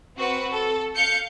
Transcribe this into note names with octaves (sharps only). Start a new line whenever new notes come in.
C4 F#4 B4
A4
F5 G6 C#7